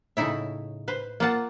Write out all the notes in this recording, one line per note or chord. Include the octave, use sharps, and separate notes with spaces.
A2 C#3 D#4 E4 E5
B4 C5
A#3 F4 F#5 A5